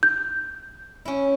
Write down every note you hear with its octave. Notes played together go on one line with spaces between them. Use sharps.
G6
C#4 E4